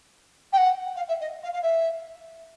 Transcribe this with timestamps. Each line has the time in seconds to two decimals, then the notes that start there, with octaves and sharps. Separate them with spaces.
0.52 G5
0.57 F#5
0.95 F5
1.08 E5
1.20 D#5
1.43 F5
1.53 F5
1.62 E5